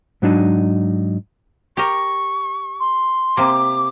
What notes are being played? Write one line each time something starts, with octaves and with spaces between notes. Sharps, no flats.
G#2 F#3 D4 D#4
G4 A#4 C#6
C6
C3 A#3 D6